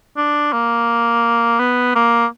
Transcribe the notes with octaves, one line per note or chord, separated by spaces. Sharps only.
D4
A#3
B3
A#3